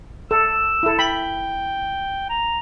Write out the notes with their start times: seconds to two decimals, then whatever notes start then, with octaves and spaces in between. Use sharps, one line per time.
0.31 A4 E6
0.83 E4 A4
0.99 G5 B5
2.29 A#5